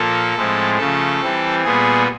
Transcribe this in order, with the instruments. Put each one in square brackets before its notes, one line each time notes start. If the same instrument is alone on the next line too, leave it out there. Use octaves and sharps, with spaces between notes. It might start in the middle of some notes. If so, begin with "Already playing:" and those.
Already playing: [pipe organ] A#2 F3 A#3 A4
A2 F3 G#3 C4
C#3 F3 A3 A4
E3 G3 C4
A#2 G3 B3 G#4